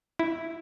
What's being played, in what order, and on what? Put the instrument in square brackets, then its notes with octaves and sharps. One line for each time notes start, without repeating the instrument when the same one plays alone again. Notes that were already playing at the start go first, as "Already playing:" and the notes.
[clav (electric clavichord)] E4